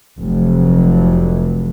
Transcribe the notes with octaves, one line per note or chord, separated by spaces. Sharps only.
F1 F#3